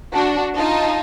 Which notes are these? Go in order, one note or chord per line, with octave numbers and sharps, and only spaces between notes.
D4 F#4
D#4 F4 A5